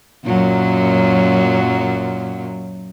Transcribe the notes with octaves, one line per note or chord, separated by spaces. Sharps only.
F#2 A#2 F#3